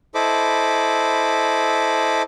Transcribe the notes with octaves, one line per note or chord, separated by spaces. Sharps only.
E4 A4 C5 D#5 B5 D6